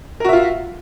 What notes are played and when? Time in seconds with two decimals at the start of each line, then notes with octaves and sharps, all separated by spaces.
0.20 A#4
0.25 F#4
0.29 E5
0.33 F4